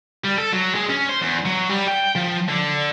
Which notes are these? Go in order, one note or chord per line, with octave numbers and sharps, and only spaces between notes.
G3
A4
F#3
G#3
C#4
C5
E2
F#3
G3
G5
F3
D3